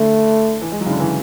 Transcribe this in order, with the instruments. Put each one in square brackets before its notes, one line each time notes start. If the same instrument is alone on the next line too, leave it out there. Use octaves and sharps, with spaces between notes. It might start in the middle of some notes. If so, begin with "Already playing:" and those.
Already playing: [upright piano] D3 [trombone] A3
[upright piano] E3
G#3
F#3
C#3
D3
E3